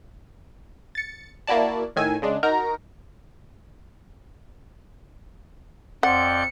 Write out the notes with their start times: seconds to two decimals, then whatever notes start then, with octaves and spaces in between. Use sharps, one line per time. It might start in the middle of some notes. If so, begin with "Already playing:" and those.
0.95 A6 C#7
1.47 A#3 E4 F#4 D5 A5
1.96 A2 D#3 G#5 E6
2.22 C#3 G#3 D4
2.43 D#4 F#4 A#4 A#5
6.03 F2 C4 D5 F#5 G6 C#7